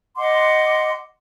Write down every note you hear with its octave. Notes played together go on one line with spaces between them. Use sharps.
D#5 F#5 C6 D6